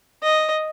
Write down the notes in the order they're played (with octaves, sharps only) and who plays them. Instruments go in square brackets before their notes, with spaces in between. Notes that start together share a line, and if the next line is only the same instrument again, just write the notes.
[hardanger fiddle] D#5